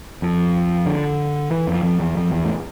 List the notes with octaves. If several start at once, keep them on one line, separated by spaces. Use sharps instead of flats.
F2
D3
E3
F2
F2
E2
F2
E2
A2